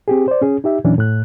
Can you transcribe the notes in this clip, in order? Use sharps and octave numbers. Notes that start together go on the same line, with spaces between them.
C4 G4 G#4
C5 D5
C#4 G#4
D#4 G4 E5
E2 A#2 E3 F#3 C#4 D4
A2 F#6